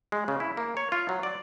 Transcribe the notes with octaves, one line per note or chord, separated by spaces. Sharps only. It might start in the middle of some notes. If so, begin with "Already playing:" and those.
G#3
C#3
E4
A#3
C#5
F4
F#3
D5